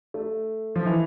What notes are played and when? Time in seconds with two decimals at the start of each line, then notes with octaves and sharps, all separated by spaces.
0.14 A3
0.76 F3
0.86 E3